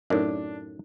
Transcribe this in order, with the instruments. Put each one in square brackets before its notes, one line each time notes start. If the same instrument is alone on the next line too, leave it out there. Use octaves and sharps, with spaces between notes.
[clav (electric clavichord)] F#2 A2 [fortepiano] D4 [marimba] D#4 A#4